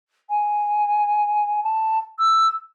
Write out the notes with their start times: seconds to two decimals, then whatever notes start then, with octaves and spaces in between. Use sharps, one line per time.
0.29 G#5
1.63 A5
2.19 E6